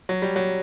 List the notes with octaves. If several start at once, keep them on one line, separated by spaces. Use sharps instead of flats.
F#3
G3
F#3